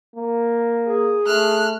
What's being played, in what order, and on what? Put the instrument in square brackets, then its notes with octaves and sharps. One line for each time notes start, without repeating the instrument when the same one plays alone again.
[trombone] A#3
[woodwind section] G#4
[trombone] A3 [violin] F6 F#6